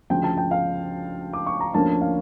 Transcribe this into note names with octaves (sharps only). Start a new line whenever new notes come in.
D2 C#3 F3 G5
A5
G5
F5
D6
C#6
A#5
D2 D3 F3 A#3 C#4 A5
F5